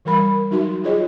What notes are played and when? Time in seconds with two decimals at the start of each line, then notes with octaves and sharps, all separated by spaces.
0.05 E3 G3 A#4 B5
0.51 F#3 D#4 F#4 E5 C6
0.84 F4 G#4 C#5 D#5